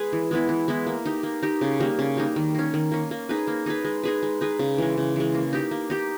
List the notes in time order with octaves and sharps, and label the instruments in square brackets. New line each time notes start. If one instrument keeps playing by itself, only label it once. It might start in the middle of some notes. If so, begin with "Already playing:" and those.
Already playing: [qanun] G#3 G#4 B4
E3
G#3 B3 E4
E3
G#3 B3 E4
A#3
D#4 G4
A#3
D#4 G4
C#3
G3 A#3 D#4
C#3
G3 A#3 D#4
D#3
A#3 C#4
D#3
A#3 C#4
A#3
D#4 G#4 B4
A#3
D#4 G#4 B4
G#3
D#4 G#4 B4
G#3
D#4 G#4 B4
C#3
E3 G#3
C#3
E3 G#3
A#3
D#4 G4
A#3
D#4 G4